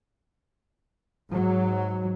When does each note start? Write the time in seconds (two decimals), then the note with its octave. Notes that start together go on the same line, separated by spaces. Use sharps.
1.31 G#2 F#3